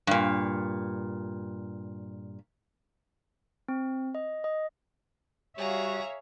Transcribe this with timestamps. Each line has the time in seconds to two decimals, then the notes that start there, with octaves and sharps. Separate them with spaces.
0.07 G2 A#2
3.68 C4
4.15 D#5
4.44 D#5
5.57 G3 F#4 G#4 C#5 E5 F5 A#5